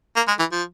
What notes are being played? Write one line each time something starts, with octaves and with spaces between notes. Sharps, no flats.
A#3
G#3
E3
F3